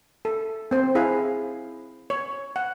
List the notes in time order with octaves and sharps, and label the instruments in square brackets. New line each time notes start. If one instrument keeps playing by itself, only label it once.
[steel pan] A4
C4 C5
E4 G#4 F5
C#5
F#5